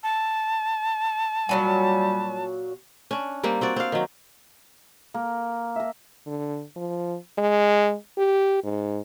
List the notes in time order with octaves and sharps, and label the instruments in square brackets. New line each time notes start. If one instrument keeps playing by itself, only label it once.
[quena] A5
[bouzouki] A#2 F#3 G#5 [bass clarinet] G3
[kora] C#4 D4
G3 A#3 C4
C4 F#4 D5
C4 F5
D#3 F#3
[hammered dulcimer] A#3
A#4 E5
[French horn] D3
F3
G#3
G4
G#2